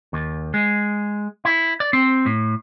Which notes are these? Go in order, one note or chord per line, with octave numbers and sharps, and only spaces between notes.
D#2
G#3
E4
D5
C4
A2